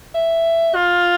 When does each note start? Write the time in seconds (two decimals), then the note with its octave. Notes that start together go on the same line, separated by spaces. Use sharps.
0.14 E5
0.75 F4